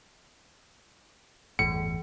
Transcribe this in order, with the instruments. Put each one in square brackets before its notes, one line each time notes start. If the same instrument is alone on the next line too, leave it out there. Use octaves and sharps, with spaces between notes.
[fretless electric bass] G1 E2 A2 [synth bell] E3 [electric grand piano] C#7